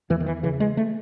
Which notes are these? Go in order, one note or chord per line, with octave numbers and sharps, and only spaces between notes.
E2 E3
D#3
E3
C#3 E3
G#3
A3